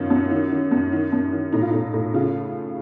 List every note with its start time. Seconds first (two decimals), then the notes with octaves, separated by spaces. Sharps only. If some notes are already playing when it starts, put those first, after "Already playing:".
Already playing: F#2 D#3 F4
0.10 F#2
0.31 D#3
0.51 D#3
0.71 F#2
0.93 D#3
1.12 F#2
1.33 D#3
1.52 A2 D#4
1.62 F4
1.71 A2 D#4
1.94 A2
2.14 C#3 F4